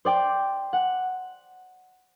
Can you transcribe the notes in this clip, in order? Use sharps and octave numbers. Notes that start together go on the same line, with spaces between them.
C5 D5 G5 D6
F#5